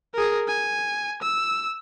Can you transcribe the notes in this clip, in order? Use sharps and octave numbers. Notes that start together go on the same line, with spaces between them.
G#4 A#4
G#5
E6